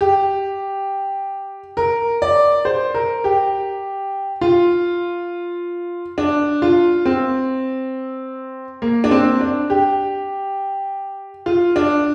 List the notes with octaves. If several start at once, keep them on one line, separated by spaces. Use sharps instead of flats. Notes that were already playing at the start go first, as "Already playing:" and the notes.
G4
A#4
D5
C5
A#4
G4
F4
D4
F4
C4
A#3
D4
C4
D4
G4
F4
D4